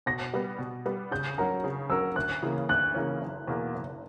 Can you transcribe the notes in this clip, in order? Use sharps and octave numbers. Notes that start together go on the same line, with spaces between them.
B2 A#6
G3 B3
B2
G3 B3
C#3 G6
F#3 C#4 F#4 A#4 A#5
C#3
F#3 C#4 F#4 A#4 E6
D2 F#6
C#3 E3 A#3 C#4
D2 F#6
C#3 E3 A#3 C#4
F#1
E2 B2 A#3
F#1